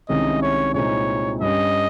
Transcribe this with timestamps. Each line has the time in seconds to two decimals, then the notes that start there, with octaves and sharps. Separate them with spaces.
0.09 C2 C3 D#3 G#3 C#4 D#5
0.42 C#5
0.74 C2 A#2 G#3 C4 D#4 C#5
1.41 G2 G3 C#4 D#5